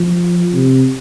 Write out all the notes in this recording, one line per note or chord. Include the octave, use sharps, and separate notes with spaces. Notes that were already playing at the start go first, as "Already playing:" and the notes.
Already playing: F3
C3